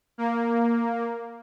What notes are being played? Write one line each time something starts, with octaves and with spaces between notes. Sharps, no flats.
A#3